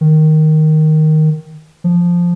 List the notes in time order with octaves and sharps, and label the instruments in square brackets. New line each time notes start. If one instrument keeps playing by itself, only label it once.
[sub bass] D#3
F3